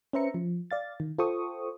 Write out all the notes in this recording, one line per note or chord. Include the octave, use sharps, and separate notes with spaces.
C#4 B4 C5 E5 A#5 C#7
F3
D5 F5 A6
D#3
F4 A4 C5 G5 C#6 D#6